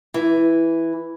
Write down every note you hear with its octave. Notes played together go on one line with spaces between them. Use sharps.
E3